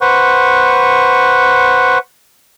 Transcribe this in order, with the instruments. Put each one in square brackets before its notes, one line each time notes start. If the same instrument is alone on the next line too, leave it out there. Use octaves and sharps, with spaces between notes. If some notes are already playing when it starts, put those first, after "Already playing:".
[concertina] B4 C5 F#5 C#6